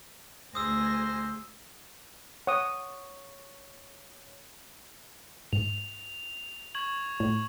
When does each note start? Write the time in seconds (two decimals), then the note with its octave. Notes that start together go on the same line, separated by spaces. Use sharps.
0.55 D2 G#4 C5 D#6 E6 A#6
2.47 C#5 F#5 D#6
5.53 G#2 F7
6.75 C#6 G#6 F#7
7.20 A2